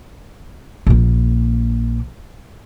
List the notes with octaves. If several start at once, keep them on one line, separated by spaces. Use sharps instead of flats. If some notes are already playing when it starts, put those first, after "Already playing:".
A#1 A#3